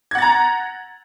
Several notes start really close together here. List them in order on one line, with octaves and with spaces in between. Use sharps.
G#6 F#5 A6 A#5